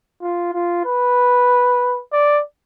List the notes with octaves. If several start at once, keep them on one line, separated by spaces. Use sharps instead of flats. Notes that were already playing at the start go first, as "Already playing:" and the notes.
F4
F4
B4
D5